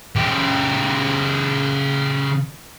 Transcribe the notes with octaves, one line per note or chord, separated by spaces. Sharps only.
C#3 G4